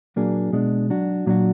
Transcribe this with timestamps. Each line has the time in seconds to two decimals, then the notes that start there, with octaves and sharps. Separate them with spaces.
0.16 A#2 F#3 A#3 D4 G#4
0.53 B2 G#3 D4
0.90 F#3 D4 F#4
1.26 A#2 F#3 D4 F#4